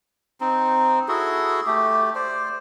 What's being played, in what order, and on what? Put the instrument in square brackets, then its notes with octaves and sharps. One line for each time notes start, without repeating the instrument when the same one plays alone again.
[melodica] C4 D#4
E4 F#4 G#4 A4
A3 G4
C5 D5